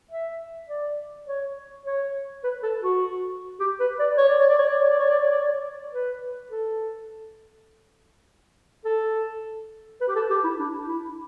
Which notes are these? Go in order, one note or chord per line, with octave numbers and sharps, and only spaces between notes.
E5
D5
C#5
C#5
B4
A4
F#4
G4
B4
D5
C#5
D5
C#5
D5
C#5
D5
C#5
D5
C#5
D5
C#5
D5
C#5
B4
A4
A4
B4
G4
A4
G4
E4
D4
E4